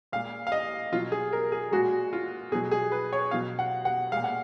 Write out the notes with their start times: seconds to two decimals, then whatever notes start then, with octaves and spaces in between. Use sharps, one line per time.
0.12 A#2 G#3 F5
0.47 F5
0.52 D#5
0.92 B2 F#3 F4
1.12 G#4
1.33 A#4
1.52 G#4
1.72 A#2 G#3 F#4
2.13 F4
2.52 B2 F#3 G#4
2.71 G#4
2.92 B4
3.13 C#5
3.31 B2 F#3 F5
3.59 F#5
3.85 F#5
4.12 A#2 G#3 F5
4.24 F#5